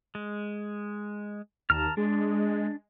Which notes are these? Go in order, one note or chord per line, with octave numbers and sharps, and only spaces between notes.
G#3
D#2 A5 A#5 F6
G#3 D4